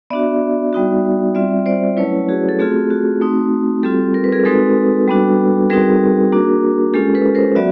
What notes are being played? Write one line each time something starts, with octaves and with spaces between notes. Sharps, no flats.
B3 D4 F#4 D5 E5
G3 B3 D#4 F#4
G3 C4 F4 D5 E5
C5 D5
F#3 A3 C#4 E4 B4 C#5
F#4 G#4
A4
A3 C4 F4 F#4 G#4
F#4
A3 C4 D#4
G3 C4 F4 G4 A4
A#4
B4
G#4 A#4
G#3 C4 D#4 F#4 A4 B4
G3 B3 D4 F#4
G3 C4 D#4 F#4 G#4 A#4
A#3 D4 F#4
G#3 C#4 F4 G4 A4
A4 B4
A#4 C5
F#3 B3 F#4 D5 E5